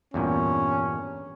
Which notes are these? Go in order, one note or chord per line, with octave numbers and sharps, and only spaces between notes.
E2 G2 A#2 C#4